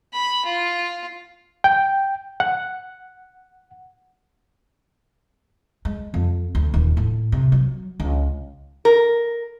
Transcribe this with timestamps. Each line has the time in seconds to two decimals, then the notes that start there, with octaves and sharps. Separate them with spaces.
0.13 B5
0.45 F4
1.64 G5
2.40 F#5
5.85 G#3
6.14 F2
6.55 D2
6.74 D#1
6.97 A2
7.32 C3
7.52 F#3
8.00 C#2
8.85 A#4